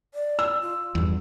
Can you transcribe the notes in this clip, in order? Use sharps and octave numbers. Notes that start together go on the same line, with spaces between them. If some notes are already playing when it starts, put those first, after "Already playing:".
D5
E6
F4
E2 G2